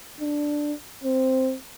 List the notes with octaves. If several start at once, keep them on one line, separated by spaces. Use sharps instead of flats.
D4
C4